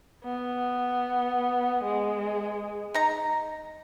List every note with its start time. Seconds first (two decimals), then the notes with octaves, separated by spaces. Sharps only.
0.25 B3
1.84 G#3
2.94 D#4 A#5